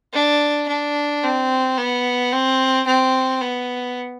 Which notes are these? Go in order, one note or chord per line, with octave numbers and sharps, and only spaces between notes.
D4
D4
C4
B3
C4
C4
B3